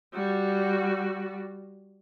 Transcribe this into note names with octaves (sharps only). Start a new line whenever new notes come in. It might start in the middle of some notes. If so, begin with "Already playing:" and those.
G3 F#4